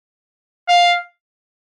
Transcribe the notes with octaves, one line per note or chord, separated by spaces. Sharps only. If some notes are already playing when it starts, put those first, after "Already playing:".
F5